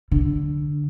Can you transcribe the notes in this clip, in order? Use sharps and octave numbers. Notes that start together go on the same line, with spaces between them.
D3